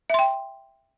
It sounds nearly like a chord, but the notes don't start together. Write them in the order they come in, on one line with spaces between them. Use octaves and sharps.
E5 C6 G5